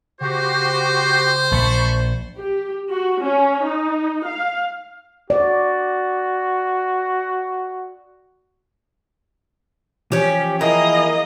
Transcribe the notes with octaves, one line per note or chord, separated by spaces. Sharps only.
C#3 F#4 G4 C5
A#1 A5 B5 C#6
G4
F#4
C#4
D#4
F5
F#4 D5
E3 F3 C#4 G4
A#3 E4 G#4 D#5 A#5